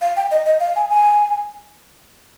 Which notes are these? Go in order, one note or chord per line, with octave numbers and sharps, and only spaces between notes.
F5
G5
D#5
D#5
F5
G#5
G#5